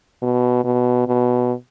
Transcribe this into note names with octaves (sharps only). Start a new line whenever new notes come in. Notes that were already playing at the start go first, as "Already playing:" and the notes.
B2
B2
B2